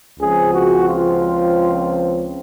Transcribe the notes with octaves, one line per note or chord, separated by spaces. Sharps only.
C#2 C#3 F3 C4 G#4
F#4
F4